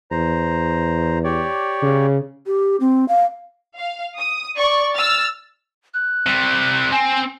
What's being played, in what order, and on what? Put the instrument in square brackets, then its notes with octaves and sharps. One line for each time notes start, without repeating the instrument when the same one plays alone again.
[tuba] E2 [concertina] C5 A#5
[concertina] G4 C#5 D5
[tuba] C#3
[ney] G4
C4
F5
[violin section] F5
D#6
D5 C#6
E6 F6 A6
[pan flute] F#6
[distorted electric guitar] C3 G3
[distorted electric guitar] C4 [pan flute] G#5